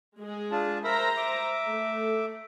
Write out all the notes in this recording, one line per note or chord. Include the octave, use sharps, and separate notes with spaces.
G#3 G#4
D4 F4 A5
A#4 C5 E5 A#5 B5
E5 D6
A3